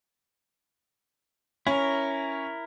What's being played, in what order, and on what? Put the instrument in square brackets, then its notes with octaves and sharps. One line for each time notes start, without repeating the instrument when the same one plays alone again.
[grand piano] C#4 [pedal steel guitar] E4 A#4